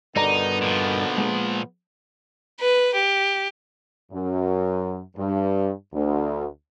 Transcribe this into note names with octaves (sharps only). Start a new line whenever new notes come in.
G2 B2 D3 D#3 B3 D#4 D5 A#5
A#2 F3
G#3 A#3
B4
G4
F#2
G2
D2